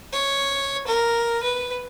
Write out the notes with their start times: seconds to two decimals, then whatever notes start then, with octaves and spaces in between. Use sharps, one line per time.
0.12 C#5
0.87 A#4
1.43 B4